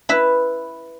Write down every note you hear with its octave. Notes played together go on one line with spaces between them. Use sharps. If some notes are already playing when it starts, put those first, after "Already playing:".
E4 B4 E5